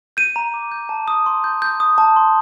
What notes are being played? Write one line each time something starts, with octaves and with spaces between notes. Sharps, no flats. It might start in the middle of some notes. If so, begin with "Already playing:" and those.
G6 D#7
A#5
D6
G6
A5
D#6
C6
G6
G6
D#6
A5
C6